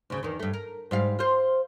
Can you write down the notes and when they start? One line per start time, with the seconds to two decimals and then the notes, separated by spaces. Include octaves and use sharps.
0.10 D2 C#3
0.23 E2 D#3
0.39 G2 A3
0.53 A#4
0.91 G#2 G3 F5
1.19 F4 C5